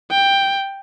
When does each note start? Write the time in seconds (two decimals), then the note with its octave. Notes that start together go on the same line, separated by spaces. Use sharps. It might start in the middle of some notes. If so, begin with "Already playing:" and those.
0.11 G5